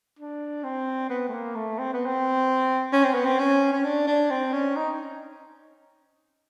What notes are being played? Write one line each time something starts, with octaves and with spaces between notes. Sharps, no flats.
D4
C4
B3
A3
A#3
A3
C4
B3
C4
C#4
C4
B3
C4
C#4
C#4
D4
D4
C4
C#4
D#4